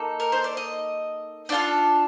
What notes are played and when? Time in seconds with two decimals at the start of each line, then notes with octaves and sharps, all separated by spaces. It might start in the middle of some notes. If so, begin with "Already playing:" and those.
Already playing: A#3 D#4 A4
0.20 A#4
0.32 C5
0.44 D5
0.57 D#5
1.49 D4 F4 A4 D5